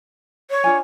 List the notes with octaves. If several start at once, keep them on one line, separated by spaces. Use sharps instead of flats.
C#5
D4 F4 G#5